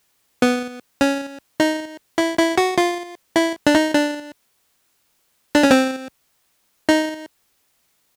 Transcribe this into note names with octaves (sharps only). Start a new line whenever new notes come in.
B3
C#4
D#4
E4
E4
F#4
F4
E4
D4
D#4
D4
D4
C#4
C4
D#4